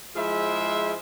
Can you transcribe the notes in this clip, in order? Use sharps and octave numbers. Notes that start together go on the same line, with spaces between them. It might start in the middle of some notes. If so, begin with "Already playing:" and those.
F3 G#3 E4 G#4 C5 E5